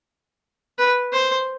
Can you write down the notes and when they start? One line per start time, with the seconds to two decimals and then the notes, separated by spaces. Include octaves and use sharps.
0.78 B4
1.12 C5